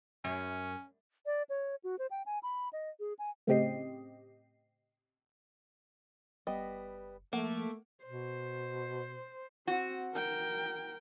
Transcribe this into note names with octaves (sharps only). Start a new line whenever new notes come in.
F#2 C#4
D5
C#5
F#4
C5
G5
G#5
B5
D#5
G#4
G#5
A2 C#3 C4 G4 D#5 C7
F#1 G3 B3 D#5
F3 A3 A#3 F#5
B2 C5
C4 F#4
A#4 G5